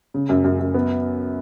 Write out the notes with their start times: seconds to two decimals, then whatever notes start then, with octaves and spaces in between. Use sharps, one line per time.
0.14 C#3
0.29 F#2
0.44 F#2
0.60 F#2
0.74 B3